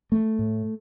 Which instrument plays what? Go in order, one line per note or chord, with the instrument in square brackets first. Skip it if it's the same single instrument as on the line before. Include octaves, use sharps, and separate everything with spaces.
[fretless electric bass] A3
A2